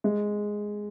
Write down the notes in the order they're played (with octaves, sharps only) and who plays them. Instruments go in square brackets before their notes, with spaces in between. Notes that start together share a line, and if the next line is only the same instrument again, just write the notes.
[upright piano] G#3